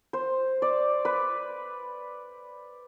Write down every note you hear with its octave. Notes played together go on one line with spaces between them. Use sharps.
C5
D5
B4